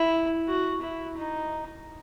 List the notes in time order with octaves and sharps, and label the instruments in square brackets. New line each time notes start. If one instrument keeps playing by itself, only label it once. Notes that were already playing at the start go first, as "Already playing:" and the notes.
Already playing: [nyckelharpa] E4
F#4
E4
D#4